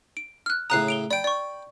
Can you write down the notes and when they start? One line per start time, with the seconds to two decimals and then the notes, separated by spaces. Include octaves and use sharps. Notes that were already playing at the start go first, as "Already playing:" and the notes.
0.17 D7
0.46 F6 F#6
0.70 A2 C#3 A#5 D#6 F#6 C7
0.88 D7 F7 G7
1.11 D5 G5 B5 D7
1.24 D5 C#6